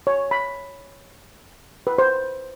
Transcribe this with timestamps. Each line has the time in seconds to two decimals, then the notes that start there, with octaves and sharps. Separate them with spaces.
0.07 C#5
0.31 B5
1.87 B4
1.98 C5